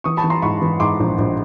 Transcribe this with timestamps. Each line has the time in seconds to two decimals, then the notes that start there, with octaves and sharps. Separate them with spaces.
0.04 E3 C#6 D#6
0.17 A5 B5
0.24 E3
0.30 A#5 C6
0.42 G#2 B5 C#6
0.62 E3
0.80 G#2 C6 D6
1.00 A#1
1.19 A#1